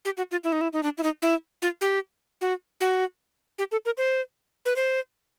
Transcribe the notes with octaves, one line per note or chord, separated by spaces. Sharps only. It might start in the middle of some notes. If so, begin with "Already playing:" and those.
G4
F#4
F4
E4
D#4
E4
D#4
D4
E4
D#4
E4
F4
G4
F#4
F#4
G4
A4
A#4
C5
B4
C5